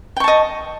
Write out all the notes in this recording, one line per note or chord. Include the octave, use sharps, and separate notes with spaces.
D#5 G5 A5 C#6